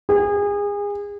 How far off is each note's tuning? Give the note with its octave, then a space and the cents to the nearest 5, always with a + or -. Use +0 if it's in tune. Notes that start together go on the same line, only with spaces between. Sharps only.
G#4 -30